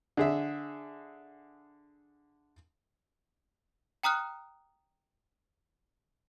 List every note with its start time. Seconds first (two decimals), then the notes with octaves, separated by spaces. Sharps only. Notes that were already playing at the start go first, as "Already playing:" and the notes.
0.17 D3 G#4 E5
4.03 G5 A#5 D#6 F6 F#6